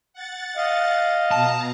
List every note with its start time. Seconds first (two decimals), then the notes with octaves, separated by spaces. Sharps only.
0.13 F#5 A6
0.57 D#5 F5
1.31 B2 A5 A#5